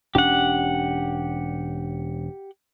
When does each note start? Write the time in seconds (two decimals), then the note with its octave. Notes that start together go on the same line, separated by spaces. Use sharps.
0.15 E1 C#4 D4 G4 F#5